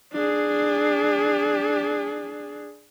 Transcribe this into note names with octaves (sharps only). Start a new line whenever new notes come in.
D4 G#4